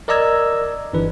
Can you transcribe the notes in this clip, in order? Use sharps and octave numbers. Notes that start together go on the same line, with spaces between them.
A#4 D5 D#5 A#5 E6 G#6
G1 E3 D4 B4